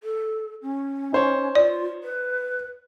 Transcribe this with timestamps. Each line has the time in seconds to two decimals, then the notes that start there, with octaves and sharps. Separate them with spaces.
0.03 A4
0.62 C#4
1.13 D#4 C5 C#5
1.55 F4 D5
2.04 B4